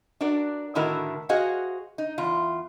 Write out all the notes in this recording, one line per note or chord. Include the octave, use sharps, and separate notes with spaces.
D4 F#4 A#4 D5
A2 D3 D#3 E4 F#4 A#4
F#4 G#4 C5 D#5 F5 F#5
D#4
E2 F4